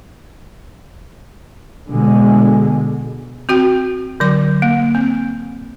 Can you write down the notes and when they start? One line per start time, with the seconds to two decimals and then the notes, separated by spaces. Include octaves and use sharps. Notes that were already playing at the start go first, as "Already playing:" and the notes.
1.90 B2 D3 G#3
3.49 C4 F#4 G5
4.20 D3 F#3 D6
4.62 A#3
4.95 C4